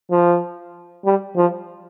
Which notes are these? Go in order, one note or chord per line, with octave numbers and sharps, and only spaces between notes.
F3
G3
F3